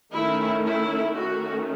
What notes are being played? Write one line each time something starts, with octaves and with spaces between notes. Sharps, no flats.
D#3 A3 C#4 E4
E4
D#3 A3 C#4 F#4